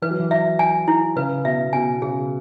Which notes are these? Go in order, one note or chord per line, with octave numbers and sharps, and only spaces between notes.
E3 B4
F#3
E3
E5
G#5
E4
C#3 B4
B2 E5
B2 G#5
C#3 G#4